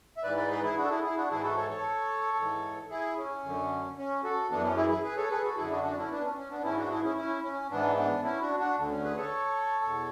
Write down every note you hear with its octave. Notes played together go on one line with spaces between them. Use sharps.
E5
G#2 E3 B4 D5
B4 D5
G#4 B4
E4 G#4
D4 F#4
A4
E4 G#4
E4 G#4
D4 F#4
G#2 E3 E4 G#4
F#4 A4
A4 C#5
A4 C#5
G#2 E3
E4 G#4
C#4
F#2 D3
C#4
F#4 A4
F#2 E3 B3 D4
C#4
E4 G#4
E4 G#4
G#4 B4
A4 C#5
G#4 B4
F#4 A4
F#2 D3 E4 G#4
D4 F#4
D4 F#4
C#4 E4
B3 D4
C#4
C#4
B3 D4
G#2 E3 C#4 E4
D4 F#4
E4 G#4
C#4 E4
C#4 E4
C#4
G#2 E3 B3 D4
B3 D4
C#4 E4
D4 F#4
D4 F#4
D2 D3
C#4
G#4 B4
A4 C#5
E2 B2